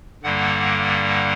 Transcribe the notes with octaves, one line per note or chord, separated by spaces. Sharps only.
G2 D3 G3 A#3 F#5